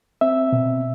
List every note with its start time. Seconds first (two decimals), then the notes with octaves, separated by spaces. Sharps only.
0.21 C4 E5
0.52 B2